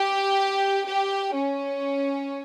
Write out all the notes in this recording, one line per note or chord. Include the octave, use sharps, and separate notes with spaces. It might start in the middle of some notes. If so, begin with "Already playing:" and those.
Already playing: G4
G4
C#4